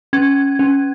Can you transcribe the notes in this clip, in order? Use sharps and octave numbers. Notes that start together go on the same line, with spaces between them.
C#4 G#6
C#4